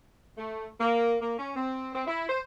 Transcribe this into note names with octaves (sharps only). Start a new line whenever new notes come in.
A3
A#3
A#3
C#4
C4
C4
E4
C5